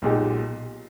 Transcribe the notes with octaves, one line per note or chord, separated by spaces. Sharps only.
B1 A#2 G#3 D#4 G4